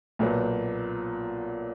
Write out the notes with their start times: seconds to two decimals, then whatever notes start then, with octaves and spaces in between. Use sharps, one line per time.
0.19 B1 A#2 F#3 B3